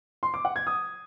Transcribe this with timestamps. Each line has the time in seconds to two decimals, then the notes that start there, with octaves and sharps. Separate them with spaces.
0.23 C6
0.34 D6
0.45 F#5
0.56 G#6
0.67 D#6